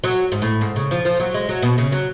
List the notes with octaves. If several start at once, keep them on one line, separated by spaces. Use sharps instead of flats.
F#3
G#2
A2
G#2
C#3
F3
F3
F#3
G#3
F#3
B2
C#3
F#3